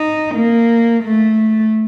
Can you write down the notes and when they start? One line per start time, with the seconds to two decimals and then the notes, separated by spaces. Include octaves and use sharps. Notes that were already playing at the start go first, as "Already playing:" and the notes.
Already playing: D#4
0.35 A#3
1.04 A3